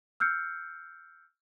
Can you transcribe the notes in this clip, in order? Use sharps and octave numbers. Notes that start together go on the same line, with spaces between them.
E6 F6 G6 C7 C#7